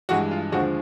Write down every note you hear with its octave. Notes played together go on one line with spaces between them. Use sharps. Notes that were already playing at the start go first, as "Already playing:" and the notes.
G2 E3 G#3 F#4
F4
D#2 D3 F3 G#3 F#4